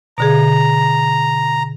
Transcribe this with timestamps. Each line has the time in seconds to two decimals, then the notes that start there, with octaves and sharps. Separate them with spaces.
0.18 B2 D3 G#4 A#5